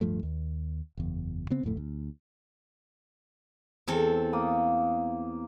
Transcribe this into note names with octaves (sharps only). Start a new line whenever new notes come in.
D1 G2 F3 A3
D#2
F#1 E2
C#3 B3 C4
D1 F2 A2 A3
D2
E2 C4 A4
A#3 D#6